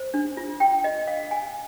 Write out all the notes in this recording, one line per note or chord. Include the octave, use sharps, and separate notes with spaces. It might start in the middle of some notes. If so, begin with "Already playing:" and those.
Already playing: C5
D4
F4
G5
D#5
F5
G#5